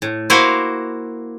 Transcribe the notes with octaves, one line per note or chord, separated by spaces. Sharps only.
A2
A#3 E4 F#4 A#4 C5 F5